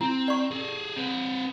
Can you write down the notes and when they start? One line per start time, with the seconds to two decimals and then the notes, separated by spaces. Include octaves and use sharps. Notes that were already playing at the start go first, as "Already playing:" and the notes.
0.01 C4 E4
0.28 D5 C#6
0.51 G#4 A4
0.96 C4 B4